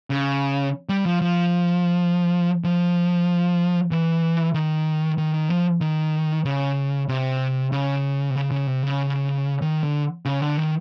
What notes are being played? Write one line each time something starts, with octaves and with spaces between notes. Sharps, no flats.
C#3
G3
F3
F3
F3
E3
D#3
D#3
D#3
F3
D#3
C#3
C3
C#3
C3
C#3
C#3
C3
C#3
D#3
D3
C#3
D3
D#3